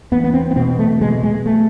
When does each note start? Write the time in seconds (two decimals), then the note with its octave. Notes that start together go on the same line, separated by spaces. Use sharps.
0.11 E2 B3
0.24 B3
0.33 C4
0.51 B3
0.56 B2 C4
0.79 A3
1.01 B2 G#3
1.23 G#3
1.46 A3